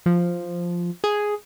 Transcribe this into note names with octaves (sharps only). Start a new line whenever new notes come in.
F3
G#4